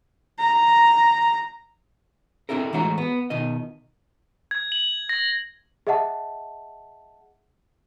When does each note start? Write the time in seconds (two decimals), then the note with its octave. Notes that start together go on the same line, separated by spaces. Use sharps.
0.39 A#5
2.49 C4 D4 E4 A4 A#4
2.73 A2 E3 G#3 F#4 C#5 A#5
2.98 B3
3.30 B2 D#3 D#5
4.51 G#6
4.72 F#7
5.09 A#6
5.87 G#4 D#5 E5 F#5 A5